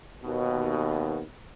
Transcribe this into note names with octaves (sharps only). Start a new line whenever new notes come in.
D#2 B2